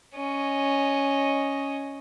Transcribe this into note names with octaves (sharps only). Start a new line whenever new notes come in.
C#4 D#5